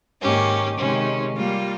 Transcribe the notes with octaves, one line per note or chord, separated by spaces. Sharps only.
G#2 D#3 A#3 C#4 G4
C3 D#3 G#3 C#4
G3 A#3 F4